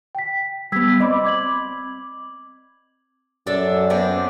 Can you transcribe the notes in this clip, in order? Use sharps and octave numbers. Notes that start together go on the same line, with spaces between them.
G5 B6
G3 B3 E6 G#6 B6
C4 D5 D#5 B5 D6
D6 G#6 F#7
F#2 D4 A4
B3 C4 D4